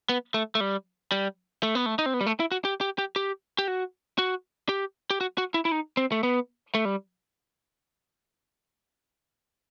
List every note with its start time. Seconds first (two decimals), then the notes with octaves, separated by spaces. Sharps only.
0.09 B3
0.34 A3
0.55 A3
0.60 G3
1.12 G3
1.63 A3
1.75 B3
1.86 A3
1.99 D#4
2.06 C4
2.14 B3
2.21 G3
2.26 A3
2.40 E4
2.52 F#4
2.65 G4
2.81 G4
2.98 G4
3.16 G4
3.59 G4
3.68 F#4
4.19 F#4
4.69 G4
5.10 G4
5.21 F#4
5.38 F#4
5.54 E4
5.65 E4
5.72 D#4
5.97 C4
6.12 A3
6.23 B3
6.75 A3
6.85 G3